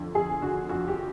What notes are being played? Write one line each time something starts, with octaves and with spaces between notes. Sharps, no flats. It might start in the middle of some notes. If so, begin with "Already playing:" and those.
Already playing: F2 D3
F2 G#4
D3 F#4
F2 F#4
G4